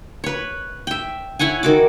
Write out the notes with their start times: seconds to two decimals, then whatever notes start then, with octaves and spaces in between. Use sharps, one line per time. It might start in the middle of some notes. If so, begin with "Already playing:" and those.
0.24 B4 C#5
0.87 E5 G5
1.39 E4 C#5 F#5 G#5
1.63 D#3 F#4 D6